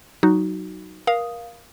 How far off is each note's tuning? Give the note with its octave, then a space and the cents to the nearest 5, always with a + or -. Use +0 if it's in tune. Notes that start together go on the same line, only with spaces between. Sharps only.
F#3 +15 D#4 +0 F#4 +0
A#4 +20 F5 +0 D#6 +0